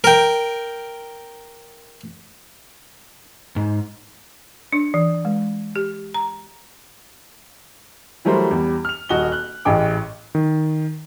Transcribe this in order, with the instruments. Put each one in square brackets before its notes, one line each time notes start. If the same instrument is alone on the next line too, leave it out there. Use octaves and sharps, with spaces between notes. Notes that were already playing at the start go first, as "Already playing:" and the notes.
[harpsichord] A#4 G5
[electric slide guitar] G#2
[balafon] D4
E3
G#3
G4
A#5
[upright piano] E3 F#3 G3 A3 A#4 C5
E2 G3
F6 F7
D#1 F#4 D#5 G7
F#6
A1 A2 G#4 G5 D6
[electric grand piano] D#3